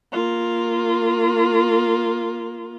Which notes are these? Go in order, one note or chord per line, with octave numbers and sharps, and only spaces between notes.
A#3 F4